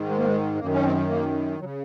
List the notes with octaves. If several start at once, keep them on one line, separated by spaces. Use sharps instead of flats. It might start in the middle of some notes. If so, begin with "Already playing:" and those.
Already playing: G#2 D#3
G#3
A#3
G#3
G#3
F#2 D#3 A#3
C#4
C4
A#3
F#3
C#3